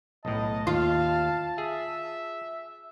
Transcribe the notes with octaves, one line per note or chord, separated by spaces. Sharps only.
B1 A2 D#5 A5
D#2 F4 F5
G#4 E5